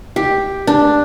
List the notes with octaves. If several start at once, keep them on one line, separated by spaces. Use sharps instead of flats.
G4
D4